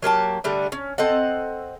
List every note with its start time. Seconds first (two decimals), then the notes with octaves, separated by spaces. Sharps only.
0.02 F#3 A#3 G4 A5
0.44 D3 G3 A3
0.72 C#4
0.98 C4 A4 D#5 F#5